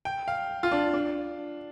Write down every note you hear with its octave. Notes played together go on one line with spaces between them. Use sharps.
G5
F5
F4
D4
D4